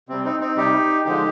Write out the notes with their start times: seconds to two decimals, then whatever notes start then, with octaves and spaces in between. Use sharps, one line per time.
0.09 C3 G3 C4
0.24 C4 D#4
0.40 C4 D#4
0.56 C3 G3 D#4 G4
1.05 D3 F3 G#3 D#4 G4